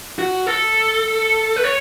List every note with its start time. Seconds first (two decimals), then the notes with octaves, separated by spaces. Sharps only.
0.19 F#4
0.46 A4
1.56 B4
1.64 C#5